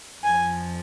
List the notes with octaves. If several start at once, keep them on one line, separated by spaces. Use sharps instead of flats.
F2 F3 G#5